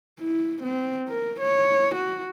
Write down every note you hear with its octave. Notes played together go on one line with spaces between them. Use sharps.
E4
C4
A#4
C#5
F#4